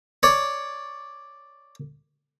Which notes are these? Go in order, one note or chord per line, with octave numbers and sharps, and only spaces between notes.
C#5 D5